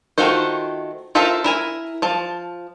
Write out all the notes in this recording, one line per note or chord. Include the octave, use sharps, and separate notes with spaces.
D#3 A3 F4 F#4 C5
F4 A4 A#4 C5 E5
E4 A#4 G#5
F3 A5